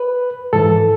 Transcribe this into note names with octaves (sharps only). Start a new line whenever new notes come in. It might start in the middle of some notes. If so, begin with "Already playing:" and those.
Already playing: B4
G#2 E3 A4